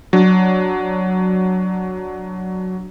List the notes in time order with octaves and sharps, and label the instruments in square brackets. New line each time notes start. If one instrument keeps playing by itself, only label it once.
[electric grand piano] F#3 D4